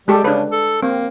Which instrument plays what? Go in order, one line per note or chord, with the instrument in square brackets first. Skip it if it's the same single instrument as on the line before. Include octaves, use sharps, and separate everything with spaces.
[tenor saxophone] G3 [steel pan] G#3 G4 A4
[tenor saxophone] C#3 [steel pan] D4 B4
[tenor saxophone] A4
[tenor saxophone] A#3 [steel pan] C4